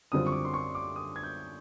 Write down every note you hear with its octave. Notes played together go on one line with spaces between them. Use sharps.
F#2 D3 G3 C4 F4 D#6
C#6
D6
C6
C#6
D6
D#6
G#6
G6